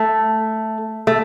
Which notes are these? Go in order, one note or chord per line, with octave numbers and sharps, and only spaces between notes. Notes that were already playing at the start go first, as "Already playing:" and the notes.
Already playing: A3
A3